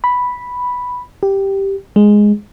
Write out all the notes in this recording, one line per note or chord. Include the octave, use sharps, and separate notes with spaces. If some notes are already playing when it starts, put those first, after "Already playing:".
B5
G4
G#3